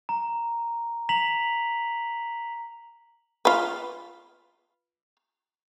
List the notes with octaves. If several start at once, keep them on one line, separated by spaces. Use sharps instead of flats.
A#5
A#5 B6 F7 F#7
F4 B4